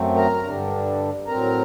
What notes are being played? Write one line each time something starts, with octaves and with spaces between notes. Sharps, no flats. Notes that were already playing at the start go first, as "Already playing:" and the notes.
Already playing: F#2 F#3 A3 C4
A#4 A#5
G2 D3 G3 D4
A2 F#3 C4 A#4 A#5